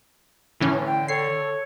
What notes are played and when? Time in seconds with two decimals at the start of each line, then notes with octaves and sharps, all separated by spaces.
0.60 A2 D3 E3 C#4
0.86 G5
1.08 A4 C#5 C7